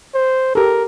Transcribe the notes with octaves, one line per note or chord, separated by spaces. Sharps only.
C5
G4 A4 A#4